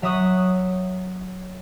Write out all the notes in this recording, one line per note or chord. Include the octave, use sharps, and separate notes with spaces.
F#3 E5 C#6 D#6 F#6